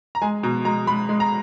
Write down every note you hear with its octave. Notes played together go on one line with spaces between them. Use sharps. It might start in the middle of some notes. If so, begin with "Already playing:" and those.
A#5
G#3 G#5
B2 A#5
G#3 A#5
G#3 B5
G#3
A#5